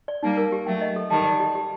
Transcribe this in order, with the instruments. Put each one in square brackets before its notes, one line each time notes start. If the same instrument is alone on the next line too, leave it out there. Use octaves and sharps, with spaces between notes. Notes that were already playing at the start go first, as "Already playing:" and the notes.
[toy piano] D5
[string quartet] G3 A#3 [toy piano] D#4
[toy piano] A#4
G4
[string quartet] F#3 A3 [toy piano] G5
[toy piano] D#5
A4
[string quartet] D#3 G3 [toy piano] A5
[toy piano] D5
G4
G4